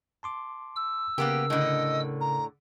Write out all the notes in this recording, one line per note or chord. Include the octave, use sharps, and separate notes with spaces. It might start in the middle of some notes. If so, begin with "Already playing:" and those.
A5 C6 D6
E6
C#3 A#3 B3 G4 A#4
A2 D3 D#5
A#5